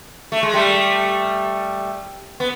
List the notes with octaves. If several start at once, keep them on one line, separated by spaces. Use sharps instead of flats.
A3
G#3
G3 A3
B3